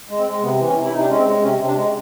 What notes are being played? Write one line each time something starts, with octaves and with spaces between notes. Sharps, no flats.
G#3
C4
G#3
C3 B3
E3
C#4
C3
E4
C3 D#4
D4
G#3 C#4
C4
G#3
C3 C#4
C3
D4
G#3